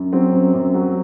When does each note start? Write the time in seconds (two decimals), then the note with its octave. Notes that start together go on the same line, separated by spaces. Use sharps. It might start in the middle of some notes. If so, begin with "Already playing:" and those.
Already playing: F#2
0.13 F#3 C4
0.33 F#2
0.54 F#2
0.74 F#3